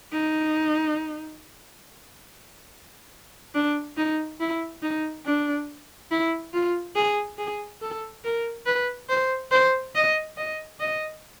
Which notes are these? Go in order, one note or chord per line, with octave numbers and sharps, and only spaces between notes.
D#4
D4
D#4
E4
D#4
D4
E4
F4
G#4
G#4
A4
A#4
B4
C5
C5
D#5
D#5
D#5